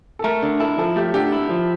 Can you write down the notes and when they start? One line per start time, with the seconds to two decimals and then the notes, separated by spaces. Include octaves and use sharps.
0.19 A4
0.24 A3 A#4
0.43 D3
0.60 E4 A4
0.78 F3 A4
0.96 A3 G4
1.14 D3 G4
1.32 E4
1.50 F3